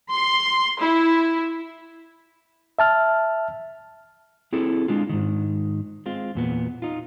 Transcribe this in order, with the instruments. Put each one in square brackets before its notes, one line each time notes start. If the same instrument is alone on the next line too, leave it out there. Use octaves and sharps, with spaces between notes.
[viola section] C6
E4
[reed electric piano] E5 A5 F6
[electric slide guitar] C4 E4 G#4 A4
G#3 D4 F4
G#2 D#3
G#3 C4 F4
E2 A#2 B3
D#4 F4